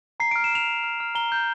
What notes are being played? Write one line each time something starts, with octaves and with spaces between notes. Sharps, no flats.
A#5 C7
D7
F6
E7
F6 F7
A#5
F6
F6
A#5 G7
G6